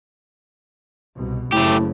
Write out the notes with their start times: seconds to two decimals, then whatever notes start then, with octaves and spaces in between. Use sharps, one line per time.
1.16 C2 B2
1.52 F#1 A2 C#3 A3 G4